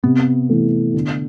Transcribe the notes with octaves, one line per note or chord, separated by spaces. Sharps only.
C3 B3
E3 A3
D3